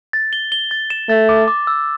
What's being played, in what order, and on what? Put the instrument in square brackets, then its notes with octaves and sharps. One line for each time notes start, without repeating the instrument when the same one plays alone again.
[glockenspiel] A6
G7
G7
A6
E7
[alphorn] A3 [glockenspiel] A6
[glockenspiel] D6
D6
E6